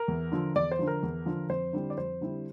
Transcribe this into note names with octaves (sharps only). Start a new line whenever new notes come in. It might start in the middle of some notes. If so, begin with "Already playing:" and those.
Already playing: A#4
E2
D3 F3
E2 D5
C5
D3 F3
A#4
E2
D3 F3
F2 C5
D3 G3 C4 E4
D5
F2 C5
D3 G3 C4 E4